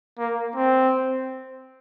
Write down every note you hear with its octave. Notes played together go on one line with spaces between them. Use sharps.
A#3
C4